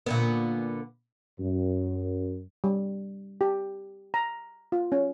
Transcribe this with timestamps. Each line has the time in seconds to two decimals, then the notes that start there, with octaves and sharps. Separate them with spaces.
0.06 A#2 D3 B3
1.40 F#2
2.64 G3
3.41 G4
4.14 A#5
4.72 F4
4.92 C#4